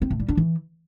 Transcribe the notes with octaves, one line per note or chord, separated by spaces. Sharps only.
C4
A2
G3
D4
E3